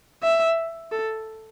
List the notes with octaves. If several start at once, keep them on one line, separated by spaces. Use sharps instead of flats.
E5
A4